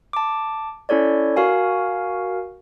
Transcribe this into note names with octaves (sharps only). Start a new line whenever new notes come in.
A5 D6
C#4 E4 A4 C#5 D5
F#4 A#4 F5 G#5